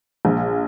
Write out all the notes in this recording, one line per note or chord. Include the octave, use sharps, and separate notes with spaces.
A#1